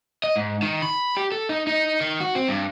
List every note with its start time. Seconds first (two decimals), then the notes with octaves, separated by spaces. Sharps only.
0.24 D#5
0.36 G#2
0.62 D#3
0.82 B5
1.17 G4
1.32 A4
1.49 D#4
1.67 D#4
2.01 D#3
2.20 F#4
2.35 C4
2.48 G2